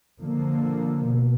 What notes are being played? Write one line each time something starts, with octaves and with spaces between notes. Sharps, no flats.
D3 F3 A#3
B2